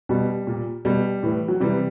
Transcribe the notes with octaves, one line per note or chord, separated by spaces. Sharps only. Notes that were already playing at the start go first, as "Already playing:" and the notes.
B2 G3
A#2
B2 G3
A2 E3
F#3
C3 E3 G3